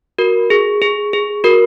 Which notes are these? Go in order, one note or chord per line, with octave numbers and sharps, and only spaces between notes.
F#4 A#4
G#4
G#4
G#4
F#4 A#4